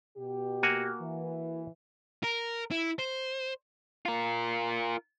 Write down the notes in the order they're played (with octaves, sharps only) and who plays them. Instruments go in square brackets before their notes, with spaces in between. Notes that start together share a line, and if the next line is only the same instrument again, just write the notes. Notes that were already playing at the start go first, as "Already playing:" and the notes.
[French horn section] B2 G4
[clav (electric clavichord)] A#3 F#4 G#5
[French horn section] E3
[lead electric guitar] A#4
E4
C5
F4 A#4